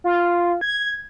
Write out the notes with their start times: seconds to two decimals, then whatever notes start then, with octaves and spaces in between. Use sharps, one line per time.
0.04 F4
0.61 G#6